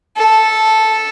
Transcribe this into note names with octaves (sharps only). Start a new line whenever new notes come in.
A4